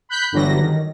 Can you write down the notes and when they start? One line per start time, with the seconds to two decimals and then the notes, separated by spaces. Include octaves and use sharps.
0.09 B5 F#6 G6 B6
0.32 G1 D3 E3 F#3 G3 A#6
0.60 D#3